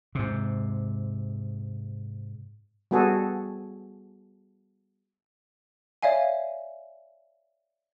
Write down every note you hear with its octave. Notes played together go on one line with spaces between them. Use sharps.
G#2 C3
G3 B3 F#4 G#4 A4
C#5 D5 E5 F5 G#5